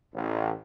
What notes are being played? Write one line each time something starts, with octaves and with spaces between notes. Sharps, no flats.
A1